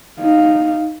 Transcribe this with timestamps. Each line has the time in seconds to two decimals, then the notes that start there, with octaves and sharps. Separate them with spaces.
0.20 D#4 F5